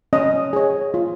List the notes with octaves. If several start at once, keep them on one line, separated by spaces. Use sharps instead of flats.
C#4 D#5
G#4 C#5
F4